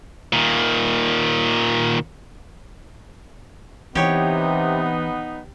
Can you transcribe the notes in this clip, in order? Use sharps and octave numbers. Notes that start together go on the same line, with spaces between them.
A#2 D#3
C3 E3 B3 D#4 G4 C#5